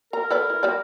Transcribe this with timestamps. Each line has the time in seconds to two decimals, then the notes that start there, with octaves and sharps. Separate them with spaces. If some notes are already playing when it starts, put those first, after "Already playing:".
0.13 A#4 A#5
0.30 A4 B4 D5
0.50 E4
0.63 G3 D5